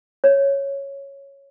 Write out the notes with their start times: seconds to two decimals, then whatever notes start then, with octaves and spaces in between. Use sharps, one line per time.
0.24 C#5